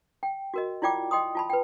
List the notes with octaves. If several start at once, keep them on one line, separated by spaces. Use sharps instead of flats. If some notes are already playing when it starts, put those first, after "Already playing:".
G5
F#4 A#4 D#5
E4 F4 D5 G5 D6
D#5 G5 C6 D#6
F4 A5 B5
B4 G5